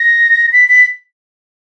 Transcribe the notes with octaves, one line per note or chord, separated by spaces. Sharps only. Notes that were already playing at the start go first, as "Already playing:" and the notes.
Already playing: A#6
B6
B6